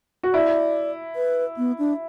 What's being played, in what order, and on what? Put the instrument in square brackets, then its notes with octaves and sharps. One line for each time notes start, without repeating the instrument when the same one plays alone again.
[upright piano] F#4
[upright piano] E4 [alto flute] D5
[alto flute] B4
B3
D4